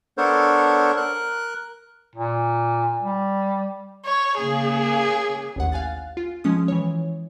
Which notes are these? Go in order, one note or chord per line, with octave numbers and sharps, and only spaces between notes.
B3 D4 A4 A#4 C5 C#5
A#4 F#6
A#2
G3
C#5
C#3 A#3 G#4
A1 D#2 F#5
F5 G#5 F#6 A6
F4
F3 G#3 C#4 D#6
E3 C#5